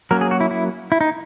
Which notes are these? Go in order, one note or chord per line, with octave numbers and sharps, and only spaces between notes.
F#3 A#3 C#4 A#4
G#4
F#4
E4
E4
E4
D#4